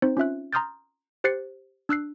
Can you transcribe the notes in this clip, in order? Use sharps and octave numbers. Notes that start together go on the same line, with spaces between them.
C4 D#4 C5
C#4 F4 E5 F#6
A#5 C6 D#6 F6 G6 A6
G4 C5 F#6 A6 C7 C#7
D4 E6 F#6 C7